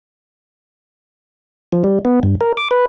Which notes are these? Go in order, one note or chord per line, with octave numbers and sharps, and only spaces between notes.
F3
G3
B3
G2
A#4
D6
B4